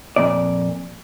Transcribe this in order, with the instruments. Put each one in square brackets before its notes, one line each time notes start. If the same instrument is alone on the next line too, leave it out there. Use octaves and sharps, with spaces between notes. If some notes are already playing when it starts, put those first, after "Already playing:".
[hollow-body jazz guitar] F2 A#2 D5